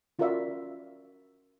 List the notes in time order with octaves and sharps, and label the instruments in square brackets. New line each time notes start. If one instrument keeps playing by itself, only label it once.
[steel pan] C#4 F4 F#4 A#4 D5 E5